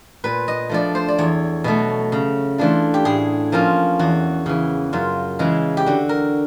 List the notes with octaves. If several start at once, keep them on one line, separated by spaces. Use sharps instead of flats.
A#2 B4
D#5
F3 A3 D4 D5
C5
D5
E2 C#5
B2 F#3 A3
C#3
E3 A3 D4 F4
G4
A2 G#4
F3 A#3 C#4 F4
E2 F#4
C#3 E3
F#2 F4
C#3 E3 G#3
G4
D3 F#4
A#4